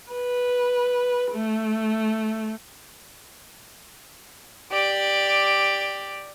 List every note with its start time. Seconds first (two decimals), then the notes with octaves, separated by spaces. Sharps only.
0.12 B4
1.32 A3
4.72 G4 D5